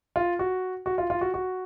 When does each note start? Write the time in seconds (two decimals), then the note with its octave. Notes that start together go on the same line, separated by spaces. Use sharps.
0.16 F4
0.39 F#4
0.86 F#4
0.98 F4
1.10 F4
1.21 F#4
1.34 F#4